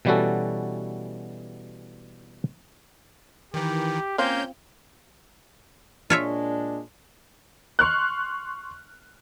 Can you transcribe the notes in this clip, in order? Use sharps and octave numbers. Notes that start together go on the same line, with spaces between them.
B2 E3 G3 C#4 F#4 A4
D#3 E3 G4
A#3 C4 C#4 F4 G6
A#2 G#3 D4 F4 C#5 E5
C6 C#6 F6 F#6